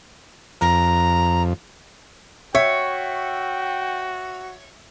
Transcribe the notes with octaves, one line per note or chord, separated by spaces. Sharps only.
F2 A#5
F#4 C#5 E5 G5